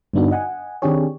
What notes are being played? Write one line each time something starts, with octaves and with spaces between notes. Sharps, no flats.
G2 D3 B3 D4 D#4 F#4
D#5 F#5 G#5
D#3 C4 D4 G4 G#4 C#5